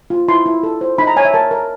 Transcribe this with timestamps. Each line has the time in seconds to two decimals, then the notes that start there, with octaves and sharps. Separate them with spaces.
0.10 F4
0.28 E4 C6
0.46 E4
0.63 A4
0.81 C5
0.98 D#4 B5
1.07 A#5
1.16 C#5 G#5
1.25 E5
1.33 A#4 A5
1.51 A#4